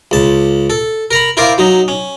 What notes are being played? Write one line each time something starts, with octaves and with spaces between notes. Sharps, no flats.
C#2 A5
A4
A#4 A#5 B5
E4 A#4 C5 D5 F5
F#3 D#4
C#4